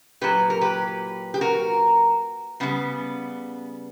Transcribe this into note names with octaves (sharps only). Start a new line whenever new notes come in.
A#2 F#3 G4 B4
A#4
G4 B4
G4
F#4 A#4
C#3 G3 B3